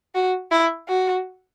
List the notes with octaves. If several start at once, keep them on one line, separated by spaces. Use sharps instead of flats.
F#4
E4
F#4